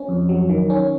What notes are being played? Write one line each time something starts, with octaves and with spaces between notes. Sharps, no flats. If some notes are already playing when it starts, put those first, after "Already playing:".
Already playing: C#4
F2
F#3
D#3
C#4